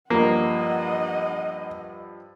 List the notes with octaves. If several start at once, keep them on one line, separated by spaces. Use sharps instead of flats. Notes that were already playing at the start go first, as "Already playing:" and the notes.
G2 F3 A#3 D#5 F#5